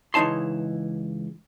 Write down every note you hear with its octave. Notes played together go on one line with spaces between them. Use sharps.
C#2 E3 D#4 C#5 A5 C6